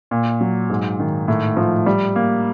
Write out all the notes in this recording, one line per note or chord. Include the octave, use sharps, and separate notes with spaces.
A#2
F#3
G#2
D#3
A2
F3
G3
A#3